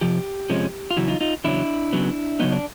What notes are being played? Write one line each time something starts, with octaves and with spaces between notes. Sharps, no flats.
F2 C3 F3 G4
F2 C3 F3 G#3 C#4
F4
E2 C#3 F#3 E4 F#4
D#4 F4
D#4 F4
E2 C#3 F#3 D4 E4
C#3 F#3 B3
C#3 F#3 B3 D#4
D4